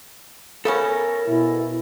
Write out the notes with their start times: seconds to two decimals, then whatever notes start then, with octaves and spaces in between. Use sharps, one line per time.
0.65 C#3 B3 C#4 A4 A#4
1.27 B2 E4